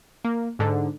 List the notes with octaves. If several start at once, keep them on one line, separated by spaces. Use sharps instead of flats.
A#3
G#2 D3